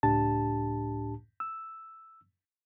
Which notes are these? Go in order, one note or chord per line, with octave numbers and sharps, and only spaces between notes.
C#2 A2 D4 G4 A5
E6